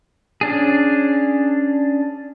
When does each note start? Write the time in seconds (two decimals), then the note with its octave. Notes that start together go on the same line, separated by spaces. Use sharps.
0.41 C#4 D4 G#4